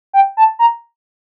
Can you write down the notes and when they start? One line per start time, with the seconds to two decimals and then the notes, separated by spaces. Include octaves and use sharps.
0.13 G5
0.37 A5
0.59 A#5